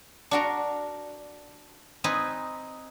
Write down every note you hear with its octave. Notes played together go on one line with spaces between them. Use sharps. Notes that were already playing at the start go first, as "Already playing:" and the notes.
D4 F#4 A#4
C4 D#4 B4 G#5